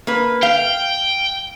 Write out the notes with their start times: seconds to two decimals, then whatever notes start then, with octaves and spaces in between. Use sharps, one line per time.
0.07 A#3 B4
0.43 F5 G5